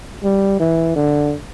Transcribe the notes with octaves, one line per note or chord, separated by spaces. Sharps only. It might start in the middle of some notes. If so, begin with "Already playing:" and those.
G3
E3
D3